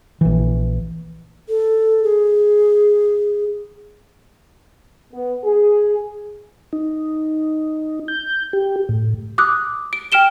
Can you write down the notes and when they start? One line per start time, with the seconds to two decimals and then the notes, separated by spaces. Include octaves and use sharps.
0.21 A#1 E3
1.49 A4
2.04 G#4
5.12 B3
5.44 G#4
6.73 D#4
8.08 G6
8.53 G4
8.89 A2
9.38 D6 D#6 F#6
9.93 D7
10.12 G5 F6 D7 E7 G7